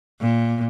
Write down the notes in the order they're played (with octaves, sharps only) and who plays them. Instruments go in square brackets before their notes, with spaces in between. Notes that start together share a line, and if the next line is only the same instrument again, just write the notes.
[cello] A#2